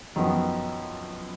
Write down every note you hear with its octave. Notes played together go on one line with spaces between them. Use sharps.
F#2 D#3 F3 B3 F#4